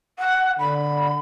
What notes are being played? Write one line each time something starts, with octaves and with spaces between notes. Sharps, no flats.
F#5
D3 B5